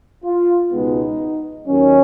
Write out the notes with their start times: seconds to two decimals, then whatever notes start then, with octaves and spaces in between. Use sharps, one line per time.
0.24 F4
0.72 C#2 B2 G#3 B3 D#4
1.67 D#2 D#3 F#3 C#4